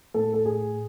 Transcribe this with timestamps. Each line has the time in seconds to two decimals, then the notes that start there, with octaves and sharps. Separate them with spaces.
0.14 A2 A4
0.34 A4
0.45 A2 G#4